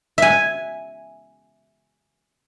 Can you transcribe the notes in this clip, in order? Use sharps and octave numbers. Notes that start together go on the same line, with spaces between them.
E5 G#5